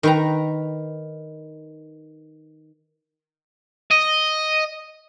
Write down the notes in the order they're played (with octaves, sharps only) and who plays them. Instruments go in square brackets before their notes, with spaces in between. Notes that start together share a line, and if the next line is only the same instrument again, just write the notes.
[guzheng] D#3 B4 A#5
[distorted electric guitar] D#5